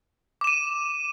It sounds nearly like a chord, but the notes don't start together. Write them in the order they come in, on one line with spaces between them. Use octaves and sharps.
D6 E7 D#7